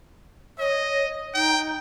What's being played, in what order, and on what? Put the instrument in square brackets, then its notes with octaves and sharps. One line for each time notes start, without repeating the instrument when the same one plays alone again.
[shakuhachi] C#5 [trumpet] D#5
[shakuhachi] D#4 [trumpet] G5